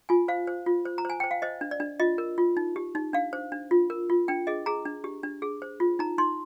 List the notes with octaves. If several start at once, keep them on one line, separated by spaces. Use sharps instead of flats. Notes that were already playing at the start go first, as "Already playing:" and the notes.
F4 G#5
C5 F5
C5
F4
C5
A#5
C5 G#5
C5 G5
F5
C5 D#5
D4
D5
D4
F4 D#5
A#4
F4
D#4
G4
D#4
D4 F5
C5
D4
F4
A#4
F4
D4 G5
G#4 D#5
G#4 A#5
D4
G4
D4
G#4
C5
F4
D#4 A#5
D#4 C6